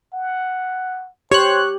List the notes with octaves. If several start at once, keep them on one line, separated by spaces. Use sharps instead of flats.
F#5
G4 C5 C#5 F#6